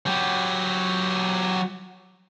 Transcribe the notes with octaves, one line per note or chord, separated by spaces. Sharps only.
F#3 G4